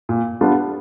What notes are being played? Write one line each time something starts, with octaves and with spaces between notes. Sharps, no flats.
A#2
G3 B3 D4 F4